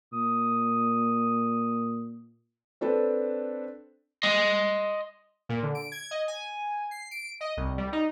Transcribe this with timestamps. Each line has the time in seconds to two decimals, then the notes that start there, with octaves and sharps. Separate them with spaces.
0.13 A#2 D#6
2.81 C4 D4 A4 B4
4.23 D#5 C6
5.49 A#2
5.63 D3
5.75 D7
5.92 G#6
6.11 D#5
6.28 G#5
6.91 C7
7.11 D7
7.41 D#5
7.57 C2
7.78 G3
7.92 D#4